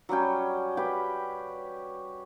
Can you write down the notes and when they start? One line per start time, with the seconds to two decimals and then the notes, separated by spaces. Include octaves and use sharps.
0.09 F#3 G3 C#4 G5
0.77 G4 B4 G5